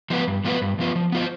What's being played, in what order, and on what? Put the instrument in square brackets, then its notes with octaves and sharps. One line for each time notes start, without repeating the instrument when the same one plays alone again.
[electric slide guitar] F3 B3 F4 B4
G2
F3 B3 F4 B4
G2
F3 B3 F4 B4
F3
B3 F4 C5